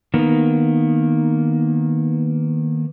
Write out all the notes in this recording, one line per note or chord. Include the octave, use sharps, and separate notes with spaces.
D#3 A#3 B3